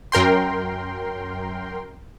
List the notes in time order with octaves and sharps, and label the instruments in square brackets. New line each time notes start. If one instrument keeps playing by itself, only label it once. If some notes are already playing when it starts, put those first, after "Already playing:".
[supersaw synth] F#2 A#4 G5 C6